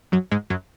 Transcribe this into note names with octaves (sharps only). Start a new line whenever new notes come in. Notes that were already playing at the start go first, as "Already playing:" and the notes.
F#2 F#3
G#2 G#3
F#2 F#3